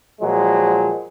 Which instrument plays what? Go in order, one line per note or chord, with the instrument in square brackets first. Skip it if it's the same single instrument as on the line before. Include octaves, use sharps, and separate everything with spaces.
[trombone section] A#2 F3 F#3 G#3